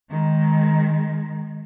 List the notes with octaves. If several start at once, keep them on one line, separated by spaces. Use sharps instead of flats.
D#3 G#3